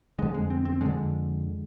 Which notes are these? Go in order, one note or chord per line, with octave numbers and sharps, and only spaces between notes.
F2 D3 G#3
G#3
C4
C4
F2 D3 G#3